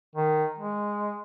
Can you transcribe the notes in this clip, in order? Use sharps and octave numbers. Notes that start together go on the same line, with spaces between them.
D#3
G#3